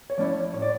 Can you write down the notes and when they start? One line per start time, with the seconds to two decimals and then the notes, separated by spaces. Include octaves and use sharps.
0.10 C#5
0.18 F3 A3 C#4 E4 D5
0.54 A2 C#5
0.62 D5